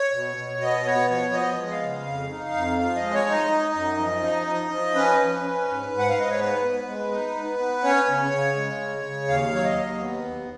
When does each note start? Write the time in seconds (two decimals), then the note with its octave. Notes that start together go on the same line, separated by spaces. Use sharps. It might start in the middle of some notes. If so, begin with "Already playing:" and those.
Already playing: C#5
0.14 B2
0.37 B2
0.61 B3 D#5
0.85 B3 C#5
1.10 F3 C#5
1.34 B3 D#5
1.57 G#3
1.70 F5
1.82 C#3
2.06 F2
2.30 D#4
2.54 F2
2.79 F3 F5
2.96 D#5
3.02 G#3
3.14 C#5
3.27 D#4
3.32 D#5
3.50 D#4
3.74 F#2
3.99 F3
4.23 D#4
4.47 F3
4.71 F3
4.95 C#4 B4
5.19 C#4
5.44 C#4
5.68 G#2
5.91 G#2
5.99 F#5
6.09 F5
6.16 G#2 D#5
6.30 C#5
6.39 B3 B4
6.64 B3
6.88 G#3
7.11 D#4
7.36 B3
7.59 B3
7.84 C#4 C#5
8.08 C#3
8.32 C#3
8.56 G#3
8.80 C#3
9.04 C#3
9.28 D#2 F5
9.53 F#3 C#5
9.64 D#5
9.76 D#2
10.00 B3
10.24 D#2